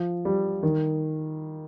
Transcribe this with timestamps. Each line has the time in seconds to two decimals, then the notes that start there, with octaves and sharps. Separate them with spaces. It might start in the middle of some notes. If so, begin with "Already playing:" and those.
Already playing: F3
0.25 G3
0.63 D#3